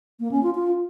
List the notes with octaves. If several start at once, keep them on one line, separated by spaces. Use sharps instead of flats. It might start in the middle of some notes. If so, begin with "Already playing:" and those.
A#3
C#4
F4
F4